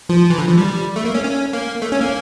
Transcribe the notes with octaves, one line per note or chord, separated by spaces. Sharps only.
F3
E3
D3
F3
G3
A3
A#3
C#4
C#4
A#3
A3
C#4
A#3